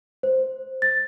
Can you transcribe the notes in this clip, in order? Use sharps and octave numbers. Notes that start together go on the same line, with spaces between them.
C5
A6